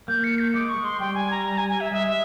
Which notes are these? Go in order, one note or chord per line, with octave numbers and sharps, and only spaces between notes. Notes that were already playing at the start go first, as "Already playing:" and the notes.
A#3 G6
C#7
G6
G#3 D6
C#6
G#3
C6
G3 G5
G#5
A#5
A#5
G#5
G#5
E5
G#3 E5
E5